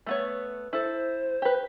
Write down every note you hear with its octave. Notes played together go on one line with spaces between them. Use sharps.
A3 B3 C#5
E4 A4 C5
G4 B4